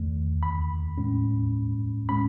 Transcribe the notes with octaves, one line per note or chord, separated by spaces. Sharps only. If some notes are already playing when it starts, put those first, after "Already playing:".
Already playing: E2 D#3 A3
B5
A2 G#3 C#4
A2 G#3 C#4 B5